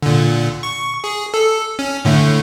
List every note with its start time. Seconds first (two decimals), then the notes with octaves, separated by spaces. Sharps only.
0.02 A#2 D3
0.63 C#6
1.04 G#4
1.34 A4
1.79 C#4
2.05 A2 D3 A3